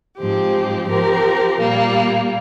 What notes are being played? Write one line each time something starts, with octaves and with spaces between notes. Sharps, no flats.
G#2 F3 C4 G4
F3 C4 G4 A#4
A#2 G3 A#3